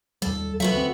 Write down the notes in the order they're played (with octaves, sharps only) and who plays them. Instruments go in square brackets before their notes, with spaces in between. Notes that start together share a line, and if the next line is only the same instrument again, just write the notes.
[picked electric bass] D#2 G3 [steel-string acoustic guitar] A4
[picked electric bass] F#3 [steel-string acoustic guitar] B3 F#4 E5
[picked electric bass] D2 C4